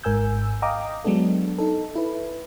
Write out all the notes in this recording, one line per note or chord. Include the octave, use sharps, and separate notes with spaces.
G#1 G#2 A#4 G#5 E6 G6
D#5 F5 G5 A#5 D6 D#6
F#3 G#3 B3 D4 A4
D#4 A4
E4 B4